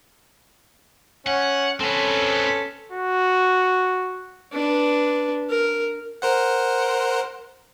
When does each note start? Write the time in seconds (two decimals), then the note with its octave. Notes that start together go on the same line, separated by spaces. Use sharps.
1.26 C#4 F#5
1.80 C4 C#4 A4 B4
2.92 F#4
4.52 D4 B4
5.50 A#4
6.22 A#4 C5 F#5